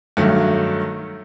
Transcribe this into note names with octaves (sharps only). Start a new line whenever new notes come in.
G2 D#3 F#3 A3